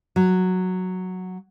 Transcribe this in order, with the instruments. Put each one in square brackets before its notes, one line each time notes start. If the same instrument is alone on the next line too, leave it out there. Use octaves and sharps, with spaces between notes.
[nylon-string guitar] F#3